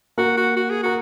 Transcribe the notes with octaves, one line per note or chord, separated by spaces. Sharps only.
A#3 F#4 A#4
F#4
F#4
G#4
F#4 A#4